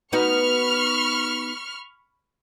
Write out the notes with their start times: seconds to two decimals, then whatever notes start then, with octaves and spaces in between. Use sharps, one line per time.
0.13 B3 D#4 F#4 B5 C#6 F6